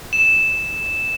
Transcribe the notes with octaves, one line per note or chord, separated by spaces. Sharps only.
E7